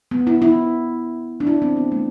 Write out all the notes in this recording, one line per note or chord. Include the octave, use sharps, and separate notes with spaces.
B3
E4
E4
D4
E4
C4
B3
A3